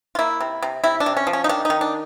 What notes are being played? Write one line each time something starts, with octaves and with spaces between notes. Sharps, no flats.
F4
A#3 E4
C3
C3
C3 E4
D4
C3
C#4
F3
C#4
D#4
D#3 D4
D#4
D#3
D4